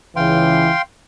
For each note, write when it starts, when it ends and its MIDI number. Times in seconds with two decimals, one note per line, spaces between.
0.16 0.71 37
0.16 0.71 49
0.16 0.71 52
0.16 0.82 77
0.16 0.82 79
0.16 0.82 84